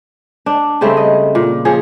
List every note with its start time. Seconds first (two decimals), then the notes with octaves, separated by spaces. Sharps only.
0.46 D4
0.81 C#3 G3 A3 C4
0.97 D#5
1.35 A#2
1.65 F3 G#4 C#5